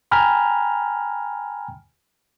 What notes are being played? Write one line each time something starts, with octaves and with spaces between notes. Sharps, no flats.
G5 G#5 A#5 B5 F6